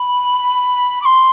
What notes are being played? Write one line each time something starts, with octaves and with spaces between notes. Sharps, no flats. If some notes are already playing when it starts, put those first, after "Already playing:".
Already playing: B5
D6
C6